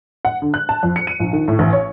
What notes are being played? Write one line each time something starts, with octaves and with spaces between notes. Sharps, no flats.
F#5
D3
F#6
A5
F2
C#7
D#7
A#1
D#3
A2
A1
C#5